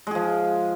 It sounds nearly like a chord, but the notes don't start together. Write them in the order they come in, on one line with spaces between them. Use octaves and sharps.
G#3 G#4 F3